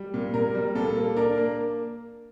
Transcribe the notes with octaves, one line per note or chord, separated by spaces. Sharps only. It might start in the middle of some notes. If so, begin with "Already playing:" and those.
Already playing: G3
A#2
A#2 A#4
G3
A#2 A4
A#3
D4 A#4
A#3